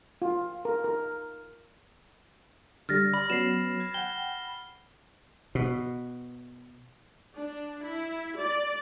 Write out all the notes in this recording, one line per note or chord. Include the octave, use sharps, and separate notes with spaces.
F4
A#4
A#4
D3 G3 F6 A6 A#6
D5 B5
F#3 B3 C#4 C7 E7
G#6 A6
F#5 G5 G7
B2
D4
E4
D5